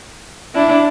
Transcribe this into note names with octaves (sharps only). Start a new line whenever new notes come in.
D4 E4